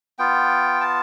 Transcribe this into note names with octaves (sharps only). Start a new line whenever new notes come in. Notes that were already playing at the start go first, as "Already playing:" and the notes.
B3 F4 G5
A5